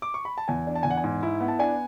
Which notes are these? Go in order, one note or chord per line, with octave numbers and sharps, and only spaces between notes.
D6
C#6
B5
A5
E2 G#5
D4
A5
E2 G#5
F#5
G#5
G#2
E4
B3
A5
D4 G#5